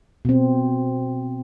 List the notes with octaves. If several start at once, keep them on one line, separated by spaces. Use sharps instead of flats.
B2 C4